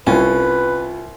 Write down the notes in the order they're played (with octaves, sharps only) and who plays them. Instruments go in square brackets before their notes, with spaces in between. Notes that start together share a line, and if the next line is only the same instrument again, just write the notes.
[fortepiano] C2 [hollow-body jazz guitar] C#4 [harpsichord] F4 [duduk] B4